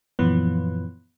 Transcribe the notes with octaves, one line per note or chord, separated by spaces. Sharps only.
F#2 A#2 E3 F3 B3